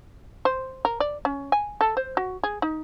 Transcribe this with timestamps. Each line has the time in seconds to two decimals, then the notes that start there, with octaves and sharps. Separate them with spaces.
0.45 C5
0.85 A#4
1.00 D5
1.25 C#4
1.52 G#5
1.81 A4
1.97 C5
2.17 F#4
2.43 G#4
2.62 D#4